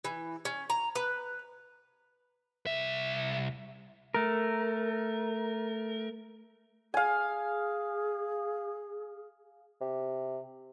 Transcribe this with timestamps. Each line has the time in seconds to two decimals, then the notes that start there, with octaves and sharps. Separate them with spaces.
0.04 E3
0.45 C#4
0.70 A#5
0.96 B4
2.67 C2 E5
4.14 A3 A#4
6.94 G#4 F5 G#5
9.81 C3